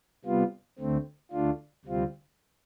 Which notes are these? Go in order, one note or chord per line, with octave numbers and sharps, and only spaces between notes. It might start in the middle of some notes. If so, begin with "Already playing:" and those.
C3 G3 B3 F4
D2 D3 A3 C4
D2 D3 A3 D4 F4
D2 C3 G3 C4 F4